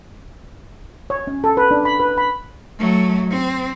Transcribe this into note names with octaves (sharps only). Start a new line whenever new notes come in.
C#5
C#4
A4
B4
D4
B5
B4
B5
F#3 A3
C4